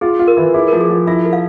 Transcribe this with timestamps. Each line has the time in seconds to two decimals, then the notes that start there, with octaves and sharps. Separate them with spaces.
0.01 F4 G#4
0.19 F4
0.28 A#4
0.37 E3
0.54 E4 G#4
0.68 F3 A#4
0.81 G#4
0.90 F3
1.07 E4 E5
1.25 A#4
1.33 F5